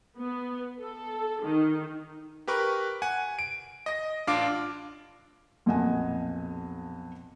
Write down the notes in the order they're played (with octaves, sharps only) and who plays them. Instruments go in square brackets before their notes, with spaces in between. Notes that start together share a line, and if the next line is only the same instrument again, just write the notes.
[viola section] B3
A4
D#3
[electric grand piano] G4 A#4 B4 C#6
F#5 G#5
D7
D#5 A#6
A1 D4 F4 F5 D6 D7
[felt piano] B1 F2 A#2 D#5 F#5 G#5